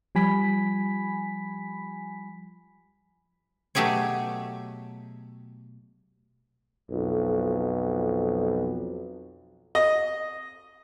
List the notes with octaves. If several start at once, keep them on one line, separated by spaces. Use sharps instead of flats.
F3 G3 G#5 B5 B6
B2 F#3 A3 G4 G#4 C#5
B1 F2
D#5